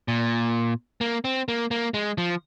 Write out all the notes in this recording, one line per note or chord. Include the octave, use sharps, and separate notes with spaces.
A#2
A#3
C4
A#3
A#3
G#3
F3